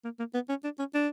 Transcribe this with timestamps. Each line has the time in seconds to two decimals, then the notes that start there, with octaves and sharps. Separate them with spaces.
0.04 A#3
0.19 A#3
0.34 B3
0.49 C#4
0.64 D4
0.79 C#4
0.94 D4